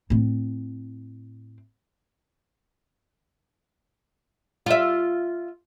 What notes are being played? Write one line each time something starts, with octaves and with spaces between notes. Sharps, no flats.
A2 C4
F4 E5